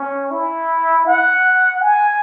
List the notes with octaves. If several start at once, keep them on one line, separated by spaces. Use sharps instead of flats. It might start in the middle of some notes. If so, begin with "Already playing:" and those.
Already playing: C#4
E4
F#5
G#5